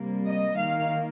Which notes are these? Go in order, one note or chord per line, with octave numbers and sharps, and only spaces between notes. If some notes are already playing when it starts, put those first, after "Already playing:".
Already playing: C3 G3 A#3
D#5
D#3 A#3 F5